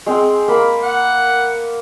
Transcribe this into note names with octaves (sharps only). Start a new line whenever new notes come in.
G#3 C4
A#3 B5
F#5